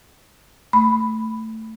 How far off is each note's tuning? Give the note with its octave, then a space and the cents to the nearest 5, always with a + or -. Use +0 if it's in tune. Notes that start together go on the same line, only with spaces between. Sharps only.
A3 +15 B5 +0